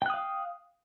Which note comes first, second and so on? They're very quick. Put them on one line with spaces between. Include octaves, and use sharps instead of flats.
G5 F#6 D#6 F5